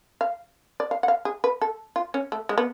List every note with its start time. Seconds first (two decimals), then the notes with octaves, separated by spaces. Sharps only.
0.21 F5
0.80 D5
0.91 F5
1.03 F#5
1.08 F5
1.25 G#4
1.44 B4
1.62 A4
1.96 F4
2.14 C#4
2.32 A3
2.49 G#3
2.58 B3